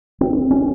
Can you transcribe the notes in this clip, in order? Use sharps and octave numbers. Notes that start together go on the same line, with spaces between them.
C4
C#4